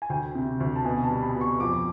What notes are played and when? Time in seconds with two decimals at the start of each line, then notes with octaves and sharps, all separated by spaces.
0.02 G#5
0.10 D2 G5
0.35 C3
0.60 D2
0.76 A5
0.85 B2 G#5
1.04 A5
1.11 G3
1.22 B5
1.35 B2
1.41 C#6
1.60 F2 D6